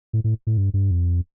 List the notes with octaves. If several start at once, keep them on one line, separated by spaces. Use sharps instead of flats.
A2
A2
A2
G2
G2
F2